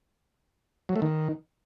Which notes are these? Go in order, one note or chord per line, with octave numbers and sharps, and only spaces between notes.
F#3
A3
D#3